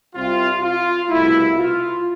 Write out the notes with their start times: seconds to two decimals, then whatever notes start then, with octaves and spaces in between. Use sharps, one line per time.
0.14 C2 C3 G3 C4 F4
0.62 F4
1.10 C2 B2 A3 E4
1.58 F4